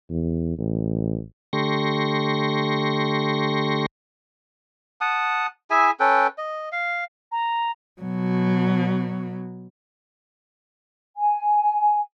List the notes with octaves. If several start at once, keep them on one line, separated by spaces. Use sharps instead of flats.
E2
A1
D3 A3 G4 C6 C#6 A#6
F#5 A5 D#6
E4 G#4 E5 G#5
C#4 A4 B4 G5
D#5
F5
A#5
B2 F#3
G#5